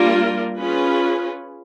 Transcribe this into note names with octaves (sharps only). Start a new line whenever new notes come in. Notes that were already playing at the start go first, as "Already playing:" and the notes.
Already playing: G3 A#3 D4 F4 A#4
C#4 F4 G#4 B4